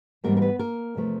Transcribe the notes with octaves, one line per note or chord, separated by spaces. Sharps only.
G#2 E3 G3 A#3 B3 A#4
A#4
B3 B4
A#3 A#4
E2 C3 F3 A3